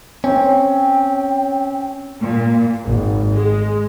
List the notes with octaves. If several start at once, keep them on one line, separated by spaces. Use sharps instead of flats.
C4 C#4 C#5 G5
A#2
G#1
G#3